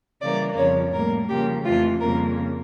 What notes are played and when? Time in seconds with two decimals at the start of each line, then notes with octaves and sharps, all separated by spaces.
0.21 C#3 E3 G3 A#3 D5
0.57 F2 C#3 F3 C#5
0.93 A2 G3 A#3 A#4
1.28 C#3 F3 A#3 G4
1.65 F2 E3 A3 F4
2.00 F2 C#3 G3 A#3 A#4